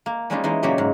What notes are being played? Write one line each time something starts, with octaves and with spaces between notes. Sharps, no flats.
A#3
G3 G#3 A#3 C#4 D#4 F4
E3 G#3 D#4
A#2 C#3 F#3 A#3 C#4 G4
G#2